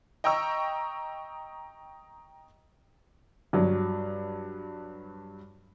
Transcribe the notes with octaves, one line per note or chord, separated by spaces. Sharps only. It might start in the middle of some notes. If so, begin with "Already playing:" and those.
D#5 G5 A#5 C#6 E6
G2 F#3